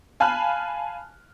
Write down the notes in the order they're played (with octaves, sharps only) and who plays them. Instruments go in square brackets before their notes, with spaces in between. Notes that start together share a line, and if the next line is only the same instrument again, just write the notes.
[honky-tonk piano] F5 G#5 A5 B5 F6 F#6